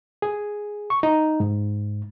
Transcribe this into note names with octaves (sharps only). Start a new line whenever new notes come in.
G#4
C#6
D#4
G#2